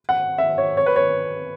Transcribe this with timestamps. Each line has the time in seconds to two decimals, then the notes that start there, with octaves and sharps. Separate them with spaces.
0.09 F#5
0.38 E5
0.58 C#5
0.77 C#5
0.86 B4
0.96 C#5